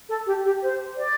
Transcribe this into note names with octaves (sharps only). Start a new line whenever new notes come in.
A4
G4
G4
C5
D5